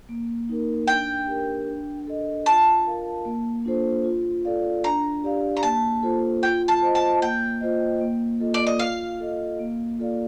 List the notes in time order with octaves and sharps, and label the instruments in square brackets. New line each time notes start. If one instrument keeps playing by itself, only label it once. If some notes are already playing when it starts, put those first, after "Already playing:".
[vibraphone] A#3
D#4 A#4
[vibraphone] D4 [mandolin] G5
[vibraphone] G4 A#4
D4
A4 D#5
[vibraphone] F4 [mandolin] A5
[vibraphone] A#4 F5
A#3
D4 F4 A4 C5
F4
A4 D5 F5
[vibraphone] D4 [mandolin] A#5
[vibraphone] G4 D5 F5
[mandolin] A#5
[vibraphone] A#3 [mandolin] A5
[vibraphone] F4 A4 C5
[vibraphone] F4 [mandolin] G5
[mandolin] A5
[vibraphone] C5 D#5
[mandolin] A5
[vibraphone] A#3 [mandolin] G5
[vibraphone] F4 C5 D#5
A#3
F4 A4 D#5
[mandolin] D5
D#5
[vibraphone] F4 [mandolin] F5
[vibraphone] A4 D#5
A#3
F4 A4 D5 F5